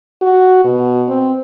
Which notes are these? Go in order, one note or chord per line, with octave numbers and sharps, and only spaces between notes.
F#4
B2
C4